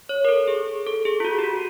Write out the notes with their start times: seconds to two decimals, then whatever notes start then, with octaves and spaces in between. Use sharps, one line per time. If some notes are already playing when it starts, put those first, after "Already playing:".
0.09 C#5
0.25 A#4
0.29 A4
0.48 G#4
0.87 A4
1.05 G#4
1.20 F4
1.25 F#4
1.39 G4
1.44 F#4